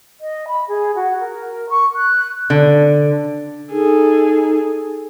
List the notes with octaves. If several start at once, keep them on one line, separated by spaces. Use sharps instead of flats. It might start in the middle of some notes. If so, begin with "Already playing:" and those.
D#5
B5
G#4
F#4
A#4
C#6
F#6
D3
D#4 G#4 A4